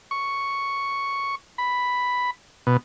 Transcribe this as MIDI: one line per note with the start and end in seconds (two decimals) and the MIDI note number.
0.11 1.35 85
1.58 2.31 83
2.67 2.77 47